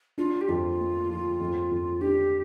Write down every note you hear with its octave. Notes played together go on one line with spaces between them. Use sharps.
D4 F4
G4
F2 F4
A#3
F3
F2
F2
D4 G4